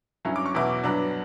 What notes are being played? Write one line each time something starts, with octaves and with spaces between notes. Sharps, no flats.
G2 F#3 C#4 E4
D6
C#6
E2 B2 F#3 B3 E4 D6
G2 F#3 B3 D4